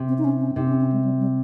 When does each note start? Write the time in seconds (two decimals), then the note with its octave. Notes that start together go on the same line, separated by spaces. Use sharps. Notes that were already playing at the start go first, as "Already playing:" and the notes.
Already playing: C3
0.08 C4
0.18 D#4
0.24 C#4
0.41 C#4
0.56 C3 D#4
0.69 C#4
0.80 C#4
0.92 G#3
1.05 G3
1.20 G3